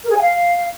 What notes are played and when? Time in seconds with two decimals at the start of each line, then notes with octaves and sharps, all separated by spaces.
0.05 A#4
0.10 G#4
0.15 G#5
0.20 F5